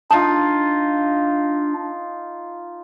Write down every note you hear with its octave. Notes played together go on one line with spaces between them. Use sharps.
D4 D#4 F4 A5